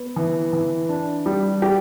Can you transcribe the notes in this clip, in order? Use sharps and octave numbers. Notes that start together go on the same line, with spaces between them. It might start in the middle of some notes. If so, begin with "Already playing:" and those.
Already playing: B3
E3
E3
D4
G3
G4